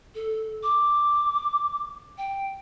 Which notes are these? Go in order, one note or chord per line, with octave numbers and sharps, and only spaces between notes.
A4
D6
G5